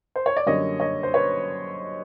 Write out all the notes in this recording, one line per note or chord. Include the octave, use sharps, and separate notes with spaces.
C5
C#5
D5
F#2 D3 G3 A#3 C#5 D#5
C#5 D#5
C5
B4 C#5